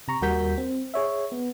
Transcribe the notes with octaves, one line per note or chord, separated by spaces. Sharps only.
C3 A#5 C#6
D#2 G3 F#4 A#4 G6 B6
C4
G#4 C#5 E5
B3